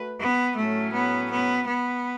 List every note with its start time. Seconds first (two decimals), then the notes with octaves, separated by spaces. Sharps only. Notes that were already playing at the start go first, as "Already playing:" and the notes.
Already playing: A3 F#4 B4
0.20 B3
0.56 A2 F#3 A3 C#4
0.92 B3
1.31 B3
1.67 B3